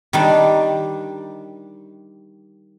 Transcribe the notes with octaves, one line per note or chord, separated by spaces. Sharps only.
D#3 G3 D4